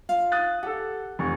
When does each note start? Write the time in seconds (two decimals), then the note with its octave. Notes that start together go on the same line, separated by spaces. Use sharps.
0.09 F4 F5
0.32 D#6 F#6 A6
0.63 G4 A4 F#5
1.19 F1 C#6